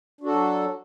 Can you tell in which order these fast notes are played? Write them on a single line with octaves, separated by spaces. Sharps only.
D4 F#4 A4 F#3